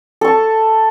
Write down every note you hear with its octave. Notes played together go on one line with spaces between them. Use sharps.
A4 A5 C#6